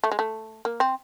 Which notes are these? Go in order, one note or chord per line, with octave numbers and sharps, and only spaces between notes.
A3
G#3
A3
A#3
C4